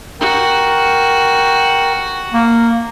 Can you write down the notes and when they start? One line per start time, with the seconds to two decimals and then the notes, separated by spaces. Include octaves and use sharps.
0.21 F#4 A#4 G5
2.34 A#3